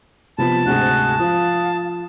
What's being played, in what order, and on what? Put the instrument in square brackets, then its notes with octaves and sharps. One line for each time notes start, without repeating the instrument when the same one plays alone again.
[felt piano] C3 F3 B3 [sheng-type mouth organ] A5 [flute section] B5
[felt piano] D2 G#2 C3 [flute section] F#4 G#4 F#6
[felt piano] F3 [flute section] F5 D#6